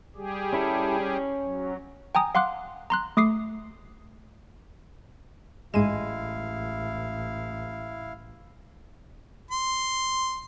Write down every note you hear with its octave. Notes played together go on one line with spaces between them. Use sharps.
G3 G4 G#4
C#4 E4 A4
C#4
F#3
G5 G#5 A#5 D#6
F5 F#5 C6 D6 F#6
A#5 C6 F#6
A3 D6 D#6 C7
A1 G#2 G#3 E4 F5 D#7 E7
C6